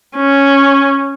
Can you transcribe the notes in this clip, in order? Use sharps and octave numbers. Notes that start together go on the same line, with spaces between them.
C#4